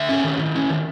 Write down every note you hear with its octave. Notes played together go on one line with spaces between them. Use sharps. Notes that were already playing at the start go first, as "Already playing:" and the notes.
Already playing: D3 E5
C#4
D#3
E4
C#4
D#3